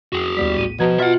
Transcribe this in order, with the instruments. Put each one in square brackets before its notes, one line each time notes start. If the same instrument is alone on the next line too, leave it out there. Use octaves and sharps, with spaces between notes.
[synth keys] F2 [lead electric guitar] F#4 G#4
[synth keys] D#2 B3 B6 [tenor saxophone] G3
[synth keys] A#1 A2 D#7
[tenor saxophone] B2 [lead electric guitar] F3 [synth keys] A#5 G#6
[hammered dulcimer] F4 [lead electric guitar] E5 F#5